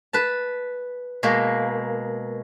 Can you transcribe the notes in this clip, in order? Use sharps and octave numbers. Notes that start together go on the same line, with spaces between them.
B4 A5
B2 G#3 A#3